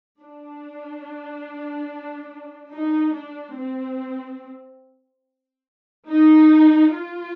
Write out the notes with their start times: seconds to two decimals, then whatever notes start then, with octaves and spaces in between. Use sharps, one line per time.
0.21 D4
2.73 D#4
3.15 D4
3.57 C4
6.09 D#4
6.92 F4